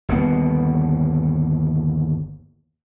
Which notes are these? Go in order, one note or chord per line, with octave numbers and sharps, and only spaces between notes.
G1 D#2 B2 B3